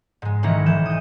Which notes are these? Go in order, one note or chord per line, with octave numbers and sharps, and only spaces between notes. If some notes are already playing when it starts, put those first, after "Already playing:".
G#2 G#3
B1 D#3 E3 A#5 C#7
E3 G6 E7
D#6 G6